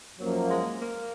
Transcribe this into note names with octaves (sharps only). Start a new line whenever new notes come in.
F#2 F3 F#3 A#3
G#3
A#3